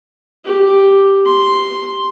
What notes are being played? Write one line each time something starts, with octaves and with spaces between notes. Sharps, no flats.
G4
C6